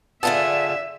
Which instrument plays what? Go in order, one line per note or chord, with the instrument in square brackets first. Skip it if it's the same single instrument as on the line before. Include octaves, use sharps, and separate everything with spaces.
[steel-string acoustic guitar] D3 F4 G#4 [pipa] B3 A4 [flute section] D5 [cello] E5